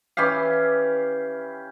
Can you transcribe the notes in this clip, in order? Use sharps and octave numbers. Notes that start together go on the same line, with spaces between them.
E3 C#4 G4 F5